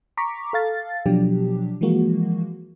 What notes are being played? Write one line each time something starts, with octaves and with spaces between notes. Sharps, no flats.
A#5 C#6 D6 B6
A4 F5 A6
B2 F3 F#3 D4 G4
E3 F3 G#3 A#3 F#4